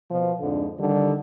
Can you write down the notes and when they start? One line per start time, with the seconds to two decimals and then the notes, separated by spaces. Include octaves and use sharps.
0.10 B2 F3
0.40 F2 G#2 D3
0.79 D3 D#3 G3